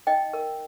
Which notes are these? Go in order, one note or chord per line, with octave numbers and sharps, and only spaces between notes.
D#4 D#5 G5
A#4